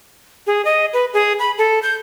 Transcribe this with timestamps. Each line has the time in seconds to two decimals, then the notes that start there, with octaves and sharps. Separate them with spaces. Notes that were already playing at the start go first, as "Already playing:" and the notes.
0.47 G#4
0.65 D#5
0.93 B4
1.14 G#4
1.39 B5
1.58 A4
1.83 G6